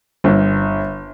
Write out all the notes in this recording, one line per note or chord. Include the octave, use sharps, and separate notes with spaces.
G1